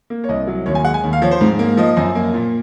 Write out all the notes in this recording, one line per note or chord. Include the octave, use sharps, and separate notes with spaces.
A#3
C#5
C2 D#5
F#3
D#2 C#5
G#5
G#3 F#5
G#5
D#2
F5
F3 C#5
C5
G#2
A#3
F3 D#5
F#2
A#3
A#2